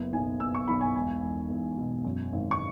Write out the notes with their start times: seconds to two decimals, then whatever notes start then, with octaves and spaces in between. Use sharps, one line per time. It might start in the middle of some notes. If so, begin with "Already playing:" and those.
Already playing: F#1 B3
0.13 B1 G#5
0.40 B3 E6
0.55 C#6
0.68 B1 B5
0.81 G#5
0.95 E1 G#5
1.22 E1
1.49 E2
1.77 B2
2.04 F#2
2.32 G#1
2.51 C#6